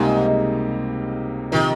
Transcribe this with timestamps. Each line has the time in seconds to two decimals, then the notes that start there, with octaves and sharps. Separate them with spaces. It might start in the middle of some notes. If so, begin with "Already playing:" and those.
Already playing: C#2 G#2 C3 G3 A#3 D#4
1.52 C3 D#3 F3